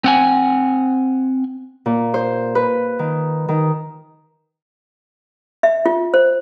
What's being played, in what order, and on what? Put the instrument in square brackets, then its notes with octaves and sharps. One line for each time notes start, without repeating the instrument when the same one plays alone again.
[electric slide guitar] C4 F#5 G#5
[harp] A#2
C5
B4
D#3
D#3
[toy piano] E5
F4
C5